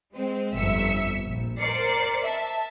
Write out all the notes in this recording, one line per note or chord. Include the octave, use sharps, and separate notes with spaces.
G#3 C4
G1 F2 E5 E6 C#7
A#1
A#4 C5 D5 C7 C#7
E5 A5